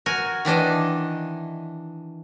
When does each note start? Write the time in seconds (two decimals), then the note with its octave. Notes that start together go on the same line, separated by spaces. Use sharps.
0.06 F#4 A#4 G#5
0.45 D#3 E3 D4 D#5